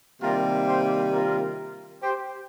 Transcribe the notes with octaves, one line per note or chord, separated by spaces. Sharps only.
C3 D#3 G3 A#3 F4 A#4
G4 C5
F4 A#4
G4 C5